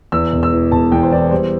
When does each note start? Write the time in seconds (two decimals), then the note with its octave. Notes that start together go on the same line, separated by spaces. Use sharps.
0.12 E2 E6
0.32 E1
0.43 E6
0.52 E3
0.71 E1 A5
0.92 E2 G5
1.03 C5
1.12 E3 D5
1.31 G3 C5